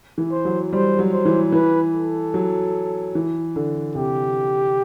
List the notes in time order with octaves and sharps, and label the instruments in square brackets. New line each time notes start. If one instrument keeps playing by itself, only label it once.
[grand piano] E3
[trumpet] C5
[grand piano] F#3
[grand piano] G3 [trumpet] C5
[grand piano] F#3
[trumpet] C5
[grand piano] E3
[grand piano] E3 [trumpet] B4
[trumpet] A4
[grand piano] F#3
E3
D3
[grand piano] C3 [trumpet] G4